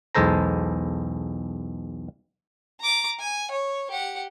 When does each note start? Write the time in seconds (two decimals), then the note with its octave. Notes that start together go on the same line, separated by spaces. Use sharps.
0.15 B1 E2 G#3 A4 C5 A#5
2.80 A#5 D6
3.19 G#5
3.51 C#5
3.90 G4 F#5